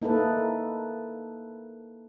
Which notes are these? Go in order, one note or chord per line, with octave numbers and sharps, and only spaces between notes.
A#3 D#4 E4 A4 B4